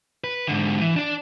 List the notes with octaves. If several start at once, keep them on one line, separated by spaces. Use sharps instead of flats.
B4
G#2 D3
E3
D4 D5